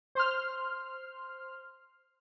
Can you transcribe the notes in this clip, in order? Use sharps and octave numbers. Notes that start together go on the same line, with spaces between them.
C5 C6 F6